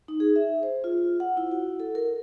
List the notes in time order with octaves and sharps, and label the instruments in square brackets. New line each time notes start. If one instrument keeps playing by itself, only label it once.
[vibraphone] D#4
G#4
E5
C5
F4
F#5
E4
F#4
A4
A#4